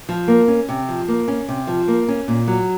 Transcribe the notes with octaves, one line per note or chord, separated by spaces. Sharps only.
F3
A#3
C#4
C3
F3
A#3
C#4
C3
F3
A#3
C#4
A#2
F#3